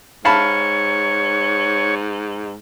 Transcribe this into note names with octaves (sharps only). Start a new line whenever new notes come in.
G#2 C#5 F5 A5 B5